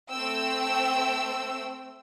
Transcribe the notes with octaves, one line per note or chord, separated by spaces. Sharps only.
A3 C4 G5 E6